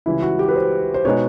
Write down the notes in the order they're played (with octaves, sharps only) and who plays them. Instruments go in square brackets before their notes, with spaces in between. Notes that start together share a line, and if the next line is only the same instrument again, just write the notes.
[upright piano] C#2 C#3 E3 G3 [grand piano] E4
[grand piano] F#4
G4
B4
C5
C5
[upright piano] B2 G#3 B3 D#4 G#4 [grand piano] C#5